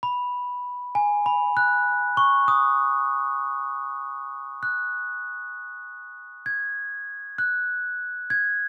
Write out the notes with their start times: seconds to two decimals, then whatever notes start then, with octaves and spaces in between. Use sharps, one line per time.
0.03 B5
0.95 G#5
1.26 B5
1.57 F#6
2.17 C#6
2.48 D#6
4.63 F#6
6.46 G#6
7.38 F#6
8.30 G#6